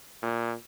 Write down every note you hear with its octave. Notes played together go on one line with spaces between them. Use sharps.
A#2